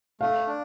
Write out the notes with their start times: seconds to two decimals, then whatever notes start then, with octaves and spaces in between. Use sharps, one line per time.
0.21 A3 F5
0.47 D4